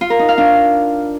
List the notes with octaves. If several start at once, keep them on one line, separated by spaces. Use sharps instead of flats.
F4
A#4
D#4
F5
D4